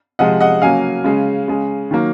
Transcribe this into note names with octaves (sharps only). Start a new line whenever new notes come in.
C3 F3 G#3 D#5 F#5
D#5 F#5
C#3 F#3 A#3 F5 G#5
C#3 G#3
C#3 G#3
D#3 F#3 A#3